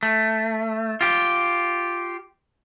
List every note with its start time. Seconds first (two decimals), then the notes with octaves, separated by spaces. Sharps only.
0.03 A3
1.01 F4 G4